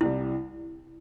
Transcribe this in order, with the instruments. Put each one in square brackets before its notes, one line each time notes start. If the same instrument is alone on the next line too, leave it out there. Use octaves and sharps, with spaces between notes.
[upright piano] C2 C3 G3 [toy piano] E4